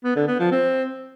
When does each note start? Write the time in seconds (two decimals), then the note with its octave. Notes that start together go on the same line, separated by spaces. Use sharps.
0.04 B3
0.16 D3
0.28 B3
0.40 F3
0.51 C4